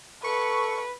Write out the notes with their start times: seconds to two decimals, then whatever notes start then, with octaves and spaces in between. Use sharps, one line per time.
0.24 A4 B4 C#6